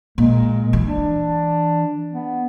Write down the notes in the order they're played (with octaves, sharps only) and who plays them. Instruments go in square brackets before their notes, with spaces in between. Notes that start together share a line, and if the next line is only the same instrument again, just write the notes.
[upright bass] A#2 [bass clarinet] G#3
[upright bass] E3
[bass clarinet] D4
B3